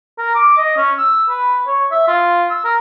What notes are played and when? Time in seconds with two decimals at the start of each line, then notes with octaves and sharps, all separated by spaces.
0.18 A#4
0.35 D6
0.57 D#5
0.77 C#4
0.98 E6
1.30 B4
1.67 C#5
1.91 E5
2.08 F4
2.50 E6
2.64 A#4